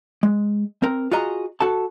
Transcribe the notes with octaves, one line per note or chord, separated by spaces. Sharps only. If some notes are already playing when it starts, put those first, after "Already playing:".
G#3
C4 A#4
F4 F#4 G#4 D#5 A#5
F#4 A4 A5